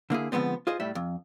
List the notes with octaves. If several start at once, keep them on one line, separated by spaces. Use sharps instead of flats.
D3 A#3 E4 G#4
D3 F3 G#3 B3 C4
F4 G#4 C5 D#5
A2 G3 E5
F2